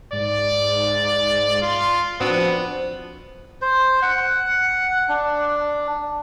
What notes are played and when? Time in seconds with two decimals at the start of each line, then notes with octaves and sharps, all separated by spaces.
0.13 G#2 D5
1.61 F4
2.20 F3 B3 C4 D4 F#4
3.62 C5
4.02 F#5
5.09 D4